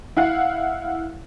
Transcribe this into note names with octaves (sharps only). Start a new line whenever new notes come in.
E4 F5 F#5